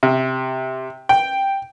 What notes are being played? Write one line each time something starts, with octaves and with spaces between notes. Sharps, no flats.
C3
G5